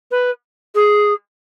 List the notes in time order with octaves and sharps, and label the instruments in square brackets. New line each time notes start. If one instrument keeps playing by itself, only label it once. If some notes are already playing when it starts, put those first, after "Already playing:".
[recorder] B4
G#4